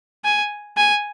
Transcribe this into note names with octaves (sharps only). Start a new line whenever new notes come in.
G#5
G#5